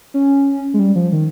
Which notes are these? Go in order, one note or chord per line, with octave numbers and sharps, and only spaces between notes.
C#4
G#3
G3
F3
D#3